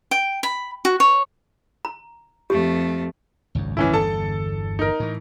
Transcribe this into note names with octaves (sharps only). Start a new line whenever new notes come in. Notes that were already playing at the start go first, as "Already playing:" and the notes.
G5
B5
F#4
C#5
A#5
F2 A3 G4
G#1 C#2 F#2
E3 C#4 E4
G1 E2 D3 A4 A5
D#4 A#4
A2 E3